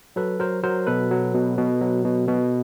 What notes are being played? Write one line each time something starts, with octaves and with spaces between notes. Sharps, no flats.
F#3 A4 B4
F#3 A#4 C5
F#3 A#4 C5
B2 A4 B4
F#3
B2
B2
F#3
B2
B2